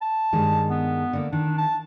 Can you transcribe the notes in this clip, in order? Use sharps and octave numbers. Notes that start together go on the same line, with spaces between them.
A5
G2 D#3 G#3
B3
D3 A#3
D#3 D4
A5